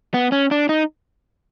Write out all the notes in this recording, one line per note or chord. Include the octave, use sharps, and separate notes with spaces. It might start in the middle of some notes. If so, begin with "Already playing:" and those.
B3
C#4
D4
D#4